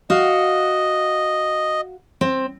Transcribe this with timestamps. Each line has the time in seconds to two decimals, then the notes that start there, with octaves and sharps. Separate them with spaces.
0.10 F#4 D#5 F5
2.21 C4